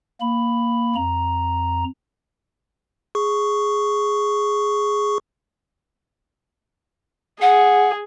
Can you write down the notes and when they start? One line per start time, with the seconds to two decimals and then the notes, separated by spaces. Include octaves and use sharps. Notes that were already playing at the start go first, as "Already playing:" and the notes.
0.21 A#3 B5
0.95 F2 A#5
3.15 G#4 C#6
7.41 G#4 F#5